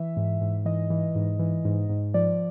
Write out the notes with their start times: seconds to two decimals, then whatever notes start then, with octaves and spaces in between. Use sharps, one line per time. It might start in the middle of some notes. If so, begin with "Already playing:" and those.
Already playing: E3 E5
0.17 G#2
0.41 G#2
0.65 E3 D#5
0.90 E3
1.15 G#2
1.39 E3
1.65 G#2
1.89 G#2
2.14 F3 D5